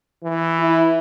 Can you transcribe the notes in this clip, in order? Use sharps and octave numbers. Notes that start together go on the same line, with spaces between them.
E3
E4